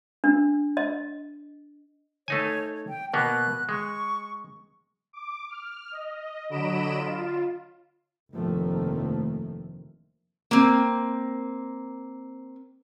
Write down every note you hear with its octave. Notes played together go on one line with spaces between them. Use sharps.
D4
D#5
A3 D#4 C#5 G#5
G5
B2 A#3 B3 F#6
G#3 C#6
D6
F6
D#5
D3 F#3 D#5 B5 D7 E7
F4
F1 G2 D#3 F3 A3 A#3
A#3 C4